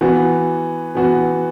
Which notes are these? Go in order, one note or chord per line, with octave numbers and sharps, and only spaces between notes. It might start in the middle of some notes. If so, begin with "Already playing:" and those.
E3 B3 F#4
E3 B3 F#4